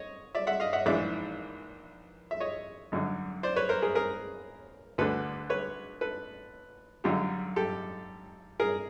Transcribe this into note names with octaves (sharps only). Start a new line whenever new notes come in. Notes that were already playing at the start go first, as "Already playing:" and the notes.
Already playing: C#5 D#5
D5 E5
E5 F#5
D#5 F5
E5 F#5
A#1 G#2 E3 D5 E5
E5
C#5 D#5
G#1 F#2 D3
C5 D5
B4 C#5
A#4 C5
G#4 A#4
G#4 A#4
D2 D3 A4 B4
B4 C#5
A4 B4
G#1 F#2 D3 F4 G4
G4 A4
G#4 A#4